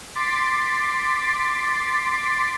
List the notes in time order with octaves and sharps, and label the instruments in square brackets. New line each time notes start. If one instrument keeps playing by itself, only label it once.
[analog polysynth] C6 D6 A6 B6 C7 D7